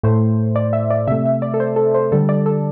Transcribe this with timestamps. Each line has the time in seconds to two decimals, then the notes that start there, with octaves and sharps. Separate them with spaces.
0.03 A2 A3 C5
0.56 D5
0.73 E5
0.91 D5
1.08 C3 A3 E5
1.26 E5
1.42 D5
1.54 A4
1.60 C5
1.76 A4
1.94 C5
2.12 D3 G3 A4
2.29 D5
2.46 A4